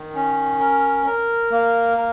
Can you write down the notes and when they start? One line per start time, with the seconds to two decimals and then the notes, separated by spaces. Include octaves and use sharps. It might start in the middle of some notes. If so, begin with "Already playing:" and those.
Already playing: D#3
0.14 C#4
0.60 A#4
1.06 A#4
1.51 A#3
1.98 A#4